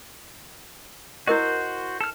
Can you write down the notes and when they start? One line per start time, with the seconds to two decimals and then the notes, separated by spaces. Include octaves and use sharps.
1.27 E4 F#4 A#4 C5 D#5
2.01 A4 F6